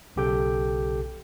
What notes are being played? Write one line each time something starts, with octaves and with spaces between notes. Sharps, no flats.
B1 C#3 G4 A4 G5